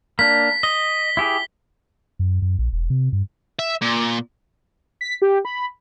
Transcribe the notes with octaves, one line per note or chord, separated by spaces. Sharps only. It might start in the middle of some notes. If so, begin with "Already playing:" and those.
A#3 D4 B6
D#5 G7
E4 G4 G#4
F#2
F#2
A#1
E1
C3
G2
E5
A#2
B6
G4
B5